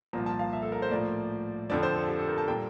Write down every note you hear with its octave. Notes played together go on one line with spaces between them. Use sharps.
C2 A#2 F3 A#3 A#5
A5
F5
E5
A4
A#4
C5
A2 F3 A#3 D5
F2 D3 F3 D5
C5
A4
G4
A4
A#4
A5
A#2 G3 A#3 G5